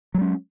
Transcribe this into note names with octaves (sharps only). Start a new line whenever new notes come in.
F#3 G#3 C#4